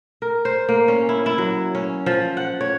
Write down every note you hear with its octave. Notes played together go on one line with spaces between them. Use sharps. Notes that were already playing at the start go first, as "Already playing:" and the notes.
A#4
C5
A#3
C#4
E4
E4
F#3
C#4
F3
F#5
C#5